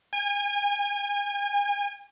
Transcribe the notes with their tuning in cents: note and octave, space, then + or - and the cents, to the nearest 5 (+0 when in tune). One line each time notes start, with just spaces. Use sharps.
G#5 -35